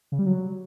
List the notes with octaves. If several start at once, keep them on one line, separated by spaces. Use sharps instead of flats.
C#3
G3
F#3